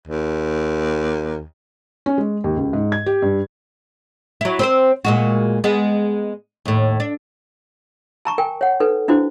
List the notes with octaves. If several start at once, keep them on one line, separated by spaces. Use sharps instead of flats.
D#2
C#4
G#3
D#2
C#2
G#2
G#6
G4
G2
F#3 E4
C4 B4 C5
A#2 G#3 F#4
G#3 B3
D#2 A2
D4
A5 A#5 C#6
A#4 G5 G#5
C#5 F#5
D#4 A4 B4
D4 E4 F#4 C5